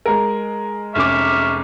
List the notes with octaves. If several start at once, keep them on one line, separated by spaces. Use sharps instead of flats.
G#3 A#4
F1 C#4 E5 C#6 D6 F6